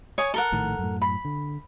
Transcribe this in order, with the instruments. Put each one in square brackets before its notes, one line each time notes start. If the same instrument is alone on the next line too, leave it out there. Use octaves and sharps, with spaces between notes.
[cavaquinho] C#5 G#5 D#6
A4 A#4 F#5
[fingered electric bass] A#1 A2 D#3
F#2 A2
[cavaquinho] B5
[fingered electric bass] D3